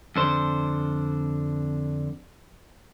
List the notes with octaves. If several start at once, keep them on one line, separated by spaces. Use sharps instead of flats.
F2 D3 C5